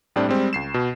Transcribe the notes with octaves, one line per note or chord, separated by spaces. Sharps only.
A2 G3 C4 D4
G3 G#3 C4
C#2 C7 E7
B2